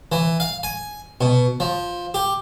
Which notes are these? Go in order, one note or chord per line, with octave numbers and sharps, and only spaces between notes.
E3
F5
G#5
B2
F3
G4